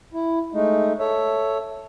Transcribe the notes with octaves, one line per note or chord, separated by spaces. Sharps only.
E4
G#3 A3 D#4
A4 C#5 E5